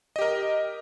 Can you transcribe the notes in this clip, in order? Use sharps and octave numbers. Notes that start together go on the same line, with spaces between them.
G4 A#4 D#5